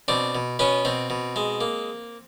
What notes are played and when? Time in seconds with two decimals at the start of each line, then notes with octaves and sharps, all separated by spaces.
0.08 B2 C4 D4
0.35 B2
0.59 B2 B3 C#4
0.85 B2 C4
1.10 B2
1.36 G#3
1.61 A#3